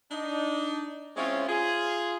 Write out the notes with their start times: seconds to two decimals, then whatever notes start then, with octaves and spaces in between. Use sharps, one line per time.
0.11 D4 D#4
1.16 G#3 C4 C#4 E4 F4 C#5
1.49 F4 G#4